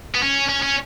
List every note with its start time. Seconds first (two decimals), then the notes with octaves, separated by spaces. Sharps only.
0.15 B3
0.22 C#4
0.49 C#4
0.62 C#4